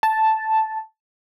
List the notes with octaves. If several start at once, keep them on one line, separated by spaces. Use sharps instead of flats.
A5